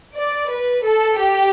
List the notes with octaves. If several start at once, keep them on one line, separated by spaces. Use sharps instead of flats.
D5
B4
A4
G4